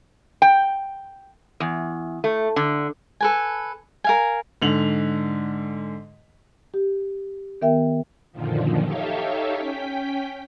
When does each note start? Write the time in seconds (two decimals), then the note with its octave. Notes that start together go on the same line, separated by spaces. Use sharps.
0.42 G5
1.60 E2
2.24 A3
2.56 D3
3.21 A4 B4 G#5
4.04 A#4 F5 G#5
4.62 G#2 D3 F7 F#7
6.74 G4
7.62 D#3 B3 A#4 E5 G5
8.32 F#2 A#2 D3 D#3 F3
8.83 D#4 G4 A4 C#5 E5 F5
9.56 C#4 G5 B6